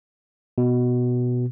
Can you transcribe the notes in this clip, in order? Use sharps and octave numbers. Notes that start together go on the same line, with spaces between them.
B2